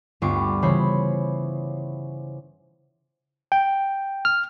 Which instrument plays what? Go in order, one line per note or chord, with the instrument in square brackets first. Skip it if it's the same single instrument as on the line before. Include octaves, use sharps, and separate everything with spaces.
[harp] D2 G2 B3 F4 C#6 D6
C#3 E3 C5 C#5 B5
[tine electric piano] G5
F6